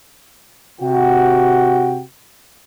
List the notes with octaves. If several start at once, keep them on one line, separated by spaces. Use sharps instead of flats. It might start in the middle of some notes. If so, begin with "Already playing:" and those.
C3 F#4 G5